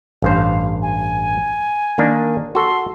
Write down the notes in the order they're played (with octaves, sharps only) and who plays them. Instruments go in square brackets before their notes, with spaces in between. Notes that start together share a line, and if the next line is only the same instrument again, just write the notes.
[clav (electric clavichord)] A1 G2 C5 [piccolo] F5
[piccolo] G#5
[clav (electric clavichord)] D#3 A#3 D4
[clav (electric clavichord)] F#4 A4 [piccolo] C6